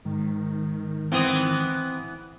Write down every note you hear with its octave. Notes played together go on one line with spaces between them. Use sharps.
G#2 D#3
E3 B3 C4 D#6